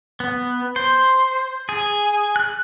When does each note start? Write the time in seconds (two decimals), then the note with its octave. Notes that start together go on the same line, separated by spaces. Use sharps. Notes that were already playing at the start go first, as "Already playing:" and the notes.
0.20 B3
0.76 C5
1.69 G#4
2.36 F#6